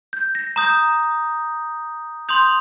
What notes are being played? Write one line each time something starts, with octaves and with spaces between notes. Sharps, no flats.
G6
A#6
A#5 D#6 G6
C6 D#6 G6 F7